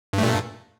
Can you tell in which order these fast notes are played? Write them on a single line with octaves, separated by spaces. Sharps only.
G2 A3 A#2